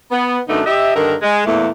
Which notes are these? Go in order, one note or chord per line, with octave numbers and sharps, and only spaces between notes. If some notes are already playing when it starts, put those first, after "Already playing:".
B3
F#2 D3 A3 B3 D4 D#4
G4 D#5 E5
G2 D3 D#3 A4 A#4
G#3
E2 A#2 A3